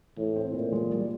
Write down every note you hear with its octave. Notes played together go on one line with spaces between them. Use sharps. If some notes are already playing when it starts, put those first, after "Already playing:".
A2 E3
C4
A#2 E3
G#3
G3